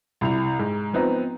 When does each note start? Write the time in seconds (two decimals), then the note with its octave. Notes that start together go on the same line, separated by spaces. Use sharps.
0.21 C2 E4 F7
0.59 G#2
0.93 F3 B3 C4 D#4